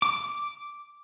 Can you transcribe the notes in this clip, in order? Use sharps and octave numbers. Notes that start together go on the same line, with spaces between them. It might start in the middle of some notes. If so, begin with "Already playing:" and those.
D6